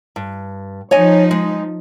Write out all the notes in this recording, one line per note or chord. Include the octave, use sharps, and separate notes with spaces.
G2
F3 D#4 C#5 D#5 G#5
G#3